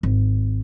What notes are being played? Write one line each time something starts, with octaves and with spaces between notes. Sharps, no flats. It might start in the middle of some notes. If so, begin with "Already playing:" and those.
G#1